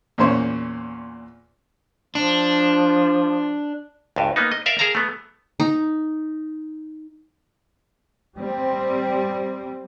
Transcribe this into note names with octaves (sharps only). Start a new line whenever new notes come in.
E2 A#2 A#3 C#4 C5 C#5
F3 D4
C#2 G2
A#3 B3 D#4
D#5
A#4 D5 E5 F5
G#4 A#4 F5 A5 A#5
A3 B3
D#4
G3 C4